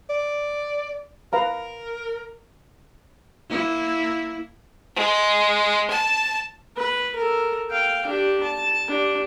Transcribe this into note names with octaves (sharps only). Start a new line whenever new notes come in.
D5
A#4 B4 F5 A#5
A#3 E4
G#3
A5
B4
A4 A#4
F5 G5
D4 G4
A5
D4 G4